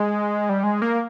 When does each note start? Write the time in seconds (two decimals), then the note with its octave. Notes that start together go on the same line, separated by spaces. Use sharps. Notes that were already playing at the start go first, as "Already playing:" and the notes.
Already playing: G#3
0.49 G3
0.64 G#3
0.82 A#3